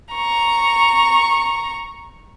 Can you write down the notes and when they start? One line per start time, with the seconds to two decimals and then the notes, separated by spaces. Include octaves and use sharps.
0.14 A#5 C#6